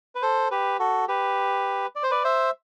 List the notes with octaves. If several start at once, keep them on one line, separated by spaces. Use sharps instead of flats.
B4
A4 C5
G4 B4
F#4 A4
G4 B4
D5
C5
B4 D5
C5 E5